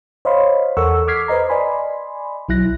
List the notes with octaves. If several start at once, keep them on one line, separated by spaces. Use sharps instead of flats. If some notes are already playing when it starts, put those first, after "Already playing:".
C5 C#5 D#5 F5 B5 C6
E2 A4 A#4 F#5 C#6 E6
D6 F6 G#6 B6 C7
B4 C5 D#5 A#5
D5 D#5 G#5 B5 C6
B1 F#3 E4 F#6 A#6